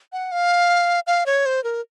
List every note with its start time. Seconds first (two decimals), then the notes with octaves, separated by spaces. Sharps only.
0.13 F#5
0.32 F5
1.07 F5
1.26 C#5
1.46 C5
1.64 A#4